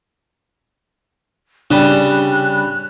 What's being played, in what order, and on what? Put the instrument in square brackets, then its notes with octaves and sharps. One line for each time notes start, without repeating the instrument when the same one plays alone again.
[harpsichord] C#3 G3 [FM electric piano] D4 B5 [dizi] F#6